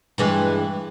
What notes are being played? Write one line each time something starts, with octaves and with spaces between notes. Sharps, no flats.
G2 E3 G#3